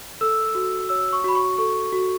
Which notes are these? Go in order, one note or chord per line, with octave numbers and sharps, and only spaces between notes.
A4 E6
F#4
C#5 E6
C#6
F#4 B5
C#6
A4 C#6
F#4